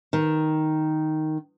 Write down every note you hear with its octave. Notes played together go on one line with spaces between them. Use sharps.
D#3